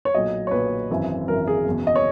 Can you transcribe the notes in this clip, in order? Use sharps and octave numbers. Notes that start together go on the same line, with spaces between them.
C#5
B1 A#2 F#3 D#5
C#5
B1 A#2 F#3 B4
G#1 F#2 E3
G#1 F#2 E3 A#4
G#4
F#1 E2 B2
D#5
C#5